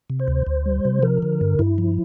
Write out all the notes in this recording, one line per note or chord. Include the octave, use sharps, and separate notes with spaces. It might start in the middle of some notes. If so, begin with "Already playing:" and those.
C3
C5
D2
D2
G3
C3
F3 A#4
D3
G2
G2 E4
F3